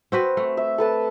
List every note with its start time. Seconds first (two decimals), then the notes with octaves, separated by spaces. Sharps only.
0.12 C4 F#4 B4
0.37 A3
0.57 E5
0.78 A4 B4 A5